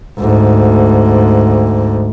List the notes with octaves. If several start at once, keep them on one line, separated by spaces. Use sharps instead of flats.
D2 G#2